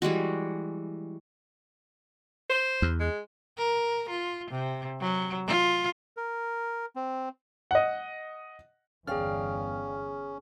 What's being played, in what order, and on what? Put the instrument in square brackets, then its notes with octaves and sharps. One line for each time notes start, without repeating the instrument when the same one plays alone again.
[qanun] E3 G3 G#3 F#4
[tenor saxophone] C5
[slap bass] E2
[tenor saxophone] G#3
[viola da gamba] A#4
F4
C3
F#3
F4
[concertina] A#4
C4
[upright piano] D#5 F#5
[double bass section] G1 E2 [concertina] C#4 [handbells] G#4 F6 [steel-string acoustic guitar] D5 F5 G5